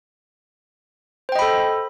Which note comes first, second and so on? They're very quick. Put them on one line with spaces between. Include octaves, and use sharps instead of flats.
C5 G5 D#5 B5 A4